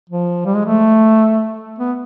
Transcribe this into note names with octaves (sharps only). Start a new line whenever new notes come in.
F3
G3
G#3
A3
B3